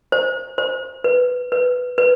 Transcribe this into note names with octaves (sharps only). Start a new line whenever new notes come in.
C5
C5
B4
B4
B4